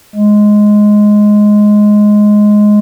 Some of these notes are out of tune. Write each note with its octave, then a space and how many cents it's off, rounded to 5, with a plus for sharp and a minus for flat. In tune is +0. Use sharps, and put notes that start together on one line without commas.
G#3 +5